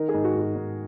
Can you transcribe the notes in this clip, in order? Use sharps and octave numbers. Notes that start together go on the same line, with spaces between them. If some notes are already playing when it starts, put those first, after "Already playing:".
Already playing: D#3 A#4
G#4
G#2
F#4
G#2 F#4
G#2